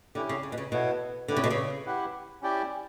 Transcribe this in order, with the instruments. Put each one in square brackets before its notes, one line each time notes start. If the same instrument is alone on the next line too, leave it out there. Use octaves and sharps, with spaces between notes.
[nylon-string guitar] D3 [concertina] C#4 E4 G4
[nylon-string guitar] C#3
C#3
B2
C#3
[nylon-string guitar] B2 [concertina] B3 E4 A4 C#5
[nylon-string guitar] D3 [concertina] E4 G4 B4 D5
[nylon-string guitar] C#3
B2
C#3
[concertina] E4 G4 B4 F#5
C#4 E4 G4 D5 G5